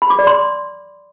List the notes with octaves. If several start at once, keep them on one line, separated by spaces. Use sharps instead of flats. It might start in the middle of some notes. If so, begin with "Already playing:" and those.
B5
D6
D5
C6